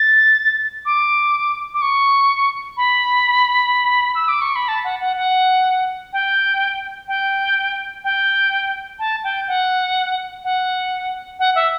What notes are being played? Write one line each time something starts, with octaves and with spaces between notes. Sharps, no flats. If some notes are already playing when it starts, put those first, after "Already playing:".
Already playing: A6
D6
D6
C#6
B5
E6
D6
C#6
B5
A5
F#5
F#5
F#5
G5
G5
G5
A5
G5
F#5
F#5
F#5
E5